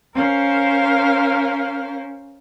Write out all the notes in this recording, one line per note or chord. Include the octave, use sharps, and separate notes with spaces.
C#4 A#4 C5 F5